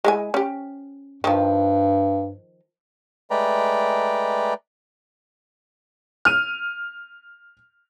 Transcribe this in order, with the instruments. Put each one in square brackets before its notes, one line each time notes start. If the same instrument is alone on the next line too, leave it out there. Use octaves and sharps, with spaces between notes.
[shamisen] G#3 E4 G#5
C#4 G4
[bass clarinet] G2 [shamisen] D#3 F3
[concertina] G#3 A3 B4 D5 G5 A#5
[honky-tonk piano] F6 D#7